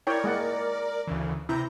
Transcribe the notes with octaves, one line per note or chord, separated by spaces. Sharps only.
E4 A#4 C#5 D5 G5
G#3 A#3 F#5
D2 C#3 E3
C3 E4 A#5 G6